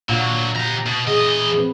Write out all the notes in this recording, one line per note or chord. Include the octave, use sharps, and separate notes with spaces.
A#2 D3 F#3 F5 F#5
G4 A#5
B2
E2 G#4 D#5
C4 B4